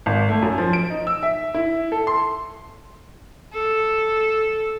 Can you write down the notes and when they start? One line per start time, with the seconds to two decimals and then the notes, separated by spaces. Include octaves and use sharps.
0.06 G#1
0.29 A3
0.42 F#2
0.58 F3
0.73 D7
0.90 D#4
1.07 E6
1.23 E5
1.54 E4
1.92 A4
2.07 C6
3.53 A4